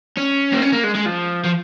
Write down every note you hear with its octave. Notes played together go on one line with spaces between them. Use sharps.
C#4
A#3
C#4
A#3
G#3
G#3
F3
F3